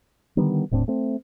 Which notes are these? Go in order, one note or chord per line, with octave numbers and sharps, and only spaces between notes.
D3 D#3 G3 B3
D#1 A2 C4 D4
A3 C4